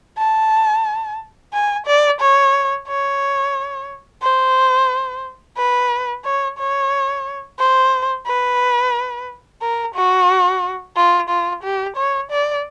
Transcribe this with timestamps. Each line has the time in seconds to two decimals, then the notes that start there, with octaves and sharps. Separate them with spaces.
0.18 A5
1.53 G#5
1.86 D5
2.21 C#5
2.88 C#5
4.22 C5
5.57 B4
6.24 C#5
6.58 C#5
7.58 C5
8.26 B4
9.61 A#4
9.95 F#4
10.96 F4
11.29 F4
11.63 G4
11.96 C#5
12.31 D5